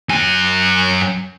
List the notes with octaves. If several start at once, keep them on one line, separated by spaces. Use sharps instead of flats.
F#2 G#5